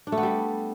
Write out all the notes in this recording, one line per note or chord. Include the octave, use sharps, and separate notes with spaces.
D4
A3
B3
G3